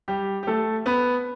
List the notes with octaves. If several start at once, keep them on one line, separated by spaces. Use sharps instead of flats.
G3 G4
G4
A3 A4
B3 B4